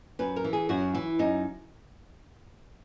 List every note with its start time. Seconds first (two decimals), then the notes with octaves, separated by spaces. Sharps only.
0.19 F#2 B4
0.36 A#4
0.44 E3
0.53 G#4
0.69 F#2 F#4
0.94 E3 E4
1.19 F#2 D#4